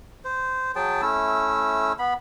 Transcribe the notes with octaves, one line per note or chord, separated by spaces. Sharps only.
C5
F#3 G#4 G5 A5
A3 C#4 E4 E6
B3 B5